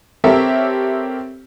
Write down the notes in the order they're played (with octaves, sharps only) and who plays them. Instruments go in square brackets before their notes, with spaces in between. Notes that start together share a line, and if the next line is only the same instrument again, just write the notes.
[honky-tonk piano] C4 G4 A4 A#4 C#5 E5